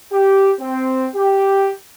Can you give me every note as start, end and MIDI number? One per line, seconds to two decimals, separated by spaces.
0.13 0.52 67
0.61 1.07 60
1.15 1.70 67